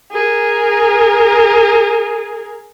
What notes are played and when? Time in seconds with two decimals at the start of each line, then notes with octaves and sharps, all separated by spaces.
0.12 G#4 A#4